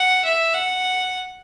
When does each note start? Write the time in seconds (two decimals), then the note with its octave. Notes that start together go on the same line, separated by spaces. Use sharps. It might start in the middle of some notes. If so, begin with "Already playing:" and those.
Already playing: F#5
0.24 E5
0.54 F#5